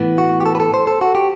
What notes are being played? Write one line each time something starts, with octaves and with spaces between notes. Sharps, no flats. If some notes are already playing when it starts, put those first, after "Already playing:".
Already playing: A2 E3 B3
F#4
G4
A4
B4
A4
C5
A4
F#4
G4